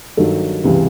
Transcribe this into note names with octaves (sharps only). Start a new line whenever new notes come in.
G2 D#3 F#3 A4
C#2 C3 E3 G3